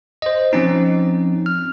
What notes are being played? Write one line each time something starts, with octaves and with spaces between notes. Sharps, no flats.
C5 D#5
F3 C4 C#4 D#4
F6